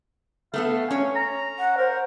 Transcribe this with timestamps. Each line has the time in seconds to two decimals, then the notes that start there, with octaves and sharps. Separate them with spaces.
0.54 A3 B3 A4 F5
0.91 C#4 C#5
1.16 A#5
1.59 F#5
1.78 A#4 C5